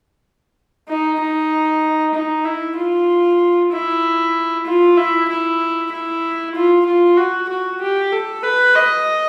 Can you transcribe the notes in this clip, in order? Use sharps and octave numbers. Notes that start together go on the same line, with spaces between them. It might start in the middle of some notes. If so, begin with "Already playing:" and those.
D#4
D#4
D#4
E4
F4
E4
F4
E4
E4
E4
F4
F4
F#4
F#4
G4
A4
B4
D#5